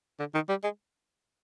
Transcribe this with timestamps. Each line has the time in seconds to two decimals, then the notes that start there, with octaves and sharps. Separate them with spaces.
0.19 D3
0.34 D#3
0.49 G3
0.63 G#3